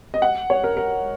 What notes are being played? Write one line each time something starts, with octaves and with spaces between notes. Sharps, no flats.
D#5
F#5
C#5
A#4
A#4